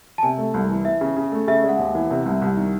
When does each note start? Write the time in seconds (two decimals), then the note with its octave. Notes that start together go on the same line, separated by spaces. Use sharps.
0.18 A5
0.23 C3 G#5
0.38 A3
0.54 C2
0.69 E3
0.85 E3 E5
1.01 C#3
1.17 C#3
1.32 A3
1.47 C#3 E5
1.63 G#3
1.69 F#5
1.79 D#2
1.95 E3
2.11 C3
2.26 C2
2.42 C2
2.57 D#3